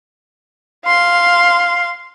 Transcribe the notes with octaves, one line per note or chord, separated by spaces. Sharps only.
F5 C6